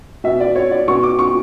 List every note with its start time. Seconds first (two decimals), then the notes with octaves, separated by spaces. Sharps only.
0.24 B2 E5
0.40 D5
0.56 C#5
0.71 D5
0.88 B2 C#6
1.03 D6
1.19 C#6